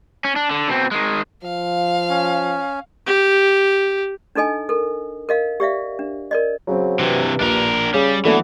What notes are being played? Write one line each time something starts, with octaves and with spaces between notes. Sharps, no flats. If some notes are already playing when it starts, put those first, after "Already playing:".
C#4
D4
D3
B2 C4
D#3 G#3
F3 F5
C#4
G4
D4 D#4 A4 D#5 G#5
A4 A#4
A#4 D#5 F5
G4 D5 E5 F5
D4
A#4 D5 D#5
C#3 F#3 C4
G2 C3 E3
A#1 D4 A#4
C#3 G3 C#4 G#4
D3 E3 F#3 A3 B3